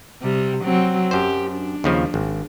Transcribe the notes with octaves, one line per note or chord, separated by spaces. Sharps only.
C3 G3
F#3 C4
F#2 G4 C5
D4
D#2 C#3 F3
G#1